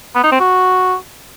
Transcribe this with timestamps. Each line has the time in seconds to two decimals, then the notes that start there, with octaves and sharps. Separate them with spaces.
0.15 B3
0.23 D#4
0.32 C4
0.40 F#4